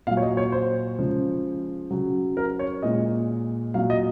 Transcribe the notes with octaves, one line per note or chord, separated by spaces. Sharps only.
A#2 F#3 F5
C#5
D#5
C#5
C5
C#3 F3 G#3
C#3 F#3
A#4
C#5
A#2 G#3 D#5
A#2 F#3 F5
D#5